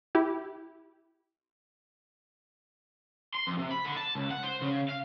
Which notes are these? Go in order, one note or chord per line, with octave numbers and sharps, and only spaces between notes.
E4 G4
C6
F2
C3
B5
D3
A5
C#2
F#5
C5
C#3
F5